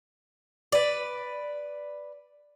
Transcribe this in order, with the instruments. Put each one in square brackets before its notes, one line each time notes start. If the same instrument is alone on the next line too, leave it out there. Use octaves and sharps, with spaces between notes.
[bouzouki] B4 D5